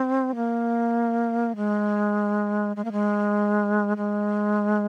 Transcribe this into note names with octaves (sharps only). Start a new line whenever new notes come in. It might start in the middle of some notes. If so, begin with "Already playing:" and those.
Already playing: C4
A#3
G#3
G#3
A#3
G#3
G#3